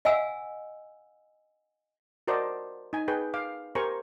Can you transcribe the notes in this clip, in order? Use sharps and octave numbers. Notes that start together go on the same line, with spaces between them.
D#5 F5 F#5 G#5 E6
F#4 A#4 C5 D5 D#5 A5
D#4 G#5
G#4 B4 G5
F5 D6
G4 A#4 C5 G#5 A#5 C#6